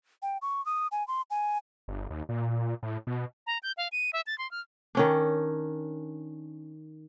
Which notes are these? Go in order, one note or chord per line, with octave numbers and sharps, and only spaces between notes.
G5
C#6
D#6
G#5
C6
G#5
G1
D#2
A#2
A2
B2
A#5
G6
F5
D#7
E5
A6
C6
F6
D#3 C#4 D4